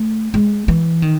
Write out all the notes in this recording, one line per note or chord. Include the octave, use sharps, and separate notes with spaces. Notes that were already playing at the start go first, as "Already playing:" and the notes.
Already playing: A3
G#3
E3
D#3